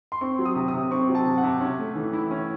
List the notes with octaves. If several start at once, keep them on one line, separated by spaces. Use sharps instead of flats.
C6
C4 C#6
F#3
D#6
C3
D#6
C3
C4 C#6
F#3
A5
C3
F#5
C3
C#4
A3
E3
E4
C#4